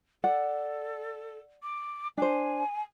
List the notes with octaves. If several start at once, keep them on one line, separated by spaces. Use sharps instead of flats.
A4 D5 F#5
D6
D4 C5 G#5